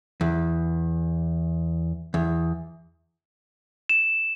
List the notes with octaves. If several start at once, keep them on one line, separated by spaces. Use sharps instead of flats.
E2
E2
E7